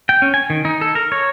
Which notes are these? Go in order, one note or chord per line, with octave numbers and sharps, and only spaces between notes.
G5
C#4
G#5
D#3
D#4
A4
A#4
C#5